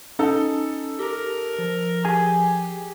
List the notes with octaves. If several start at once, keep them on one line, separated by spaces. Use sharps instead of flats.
C#4 D#4 A4
G4 A#4
F3
G4 G#4 G#5